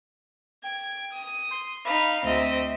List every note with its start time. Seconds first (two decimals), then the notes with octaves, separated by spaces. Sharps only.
0.63 G5 G#6
1.14 D#6
1.50 C6
1.85 D#4 F5 B5
2.25 D2 C4 D#5 E5